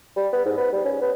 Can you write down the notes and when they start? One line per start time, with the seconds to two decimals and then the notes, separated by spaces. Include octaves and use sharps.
0.16 G3
0.32 B3
0.46 G#2
0.57 B3
0.73 G3
0.85 C#4
1.01 B3